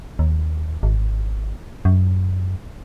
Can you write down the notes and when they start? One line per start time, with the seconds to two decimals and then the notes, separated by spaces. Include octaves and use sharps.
0.19 D#2
0.83 G#1
1.85 F#2